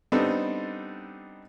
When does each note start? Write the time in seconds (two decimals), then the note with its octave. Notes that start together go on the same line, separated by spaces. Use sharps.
0.12 G3 B3 C4 D4 D#4 A4